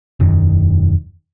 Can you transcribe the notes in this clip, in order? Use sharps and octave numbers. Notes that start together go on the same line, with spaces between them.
E1 F#2 D#3